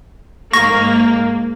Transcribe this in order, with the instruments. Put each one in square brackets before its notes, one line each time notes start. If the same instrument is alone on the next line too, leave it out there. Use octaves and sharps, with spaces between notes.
[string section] G#2 A#3 [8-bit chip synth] C#6 A#6